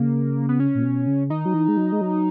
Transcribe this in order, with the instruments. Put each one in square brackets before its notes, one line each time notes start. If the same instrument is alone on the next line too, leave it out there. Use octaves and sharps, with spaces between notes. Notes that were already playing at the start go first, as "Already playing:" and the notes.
Already playing: [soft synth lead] C#3 [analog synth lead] A#3
[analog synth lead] B3
C#4
[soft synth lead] A#2
B2
C#3
[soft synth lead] D#3 [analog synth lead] D#4
[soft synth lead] F#3
E3
G#3
F#3
G#3
F#3